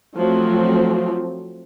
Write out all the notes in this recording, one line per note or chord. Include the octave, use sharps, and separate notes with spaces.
F3 F#3 A3 C4